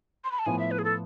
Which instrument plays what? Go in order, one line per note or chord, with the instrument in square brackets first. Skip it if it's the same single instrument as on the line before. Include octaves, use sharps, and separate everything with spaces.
[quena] C6
B5
A5
[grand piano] A2 F3 B3 [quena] G#5
[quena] E5
B4
G#4
A4